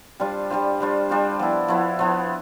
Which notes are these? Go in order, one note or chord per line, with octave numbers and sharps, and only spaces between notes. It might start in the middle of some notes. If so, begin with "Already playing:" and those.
G3 D4 F4 C5
G3 D4 F4 C5
G3 D4 F4 C5
G3 D4 F4 C5
F3 B3 E4
F3 B3 E4
F3 B3 E4